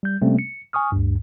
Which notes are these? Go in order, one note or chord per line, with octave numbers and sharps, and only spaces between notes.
G3 G6
C3 G3 A3 A#3 C4 C#4
C#7
G#5 C#6 D#6 F6
D2 G2